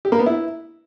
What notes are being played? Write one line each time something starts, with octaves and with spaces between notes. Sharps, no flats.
G4
A#3
B3
E4